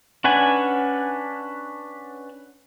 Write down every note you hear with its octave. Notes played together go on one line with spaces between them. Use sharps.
C#4 D4 B4 F#5 G#5